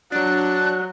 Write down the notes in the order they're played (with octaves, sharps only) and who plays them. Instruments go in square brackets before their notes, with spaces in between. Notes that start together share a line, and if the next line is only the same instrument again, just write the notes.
[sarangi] F#3 [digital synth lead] D4 [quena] F#6